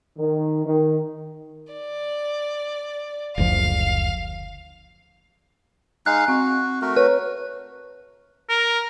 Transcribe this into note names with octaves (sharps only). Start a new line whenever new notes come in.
D#3
D#3
D5
F#1 D2 F3 F5
G#3 D#4 F5 F#6
C4 F#4
A3 F#4 A#4
B4 C#5
A#4